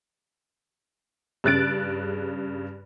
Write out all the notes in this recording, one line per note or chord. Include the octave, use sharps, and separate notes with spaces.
G2 C#3 F#6 A6 D7